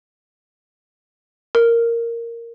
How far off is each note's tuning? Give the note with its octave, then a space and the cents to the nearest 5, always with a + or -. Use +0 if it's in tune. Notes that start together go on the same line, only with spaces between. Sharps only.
A#4 -5